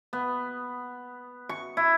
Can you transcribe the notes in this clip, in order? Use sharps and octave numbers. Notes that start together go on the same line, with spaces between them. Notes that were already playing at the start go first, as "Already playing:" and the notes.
B3
C#6
E4